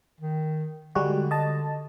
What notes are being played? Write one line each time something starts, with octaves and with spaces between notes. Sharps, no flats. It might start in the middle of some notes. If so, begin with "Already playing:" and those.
D#3
D3 G3 G#3 F#4
D#5 A5